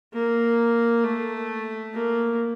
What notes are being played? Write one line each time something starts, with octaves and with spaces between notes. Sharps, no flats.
A#3
A3
A#3